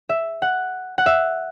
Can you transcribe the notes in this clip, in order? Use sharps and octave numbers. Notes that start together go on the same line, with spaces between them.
E5
F#5
F#5
E5